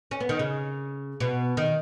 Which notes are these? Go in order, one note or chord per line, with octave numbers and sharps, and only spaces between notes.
C#4
B3
D#3
C#3
B2
D#3